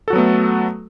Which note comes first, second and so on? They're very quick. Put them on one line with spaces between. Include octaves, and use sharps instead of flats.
A4 F#4 F#3 B3 A3